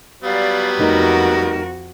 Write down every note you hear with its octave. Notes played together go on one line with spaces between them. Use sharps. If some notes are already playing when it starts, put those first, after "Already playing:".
F#3 G3 B3 D5 F5
F2 A3 D#4 F#4 A#4